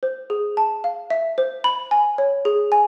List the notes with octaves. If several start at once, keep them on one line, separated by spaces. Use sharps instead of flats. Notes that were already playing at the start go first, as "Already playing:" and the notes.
C5
G#4
A5
F5
E5
C5
B5
G#5
C#5
G#4
G#5